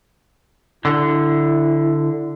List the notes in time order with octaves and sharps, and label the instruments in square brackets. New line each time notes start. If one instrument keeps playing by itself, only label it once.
[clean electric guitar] D3 [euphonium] E4